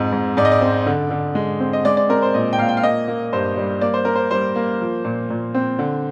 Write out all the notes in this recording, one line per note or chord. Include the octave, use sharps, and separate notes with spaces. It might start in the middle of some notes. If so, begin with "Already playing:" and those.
Already playing: F2 G#2
G#2
G#2 D5
D#5
D5
C4
D3
D3
G#3
C4
D#5
G#3 D5
D5
C4 A#4
C5
A#2 D#5
G5
A#2 F5
G5
F5
A#3 D#5
A#3
G2 C5
G3
A#3 D5
C5
A#3 A#4
C5
G3 C5
A#3
F3
A#2
A#2
C4
D3